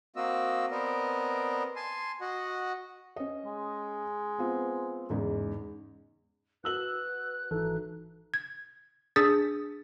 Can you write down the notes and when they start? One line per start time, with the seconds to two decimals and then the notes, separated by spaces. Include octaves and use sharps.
0.16 A#3 C4 F#4 D#5 E6
0.71 B3 C4 A#4 D5 D#5
1.76 G#5 A5 C6
2.21 F#4 D#5 F#5
3.16 C#4 D#5
3.46 G#3
4.39 B3 C4 F4
5.10 E2 G#2 C#3
6.64 F#4 B4 E6 F#6 F#7
7.51 G#1 E3 D#4 A4
8.34 G#6
9.16 D4 G#4 D#6 E6 A6 B6